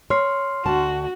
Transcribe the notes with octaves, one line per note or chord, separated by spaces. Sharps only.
C#5 C6 F6 C7
D2 F#4 A5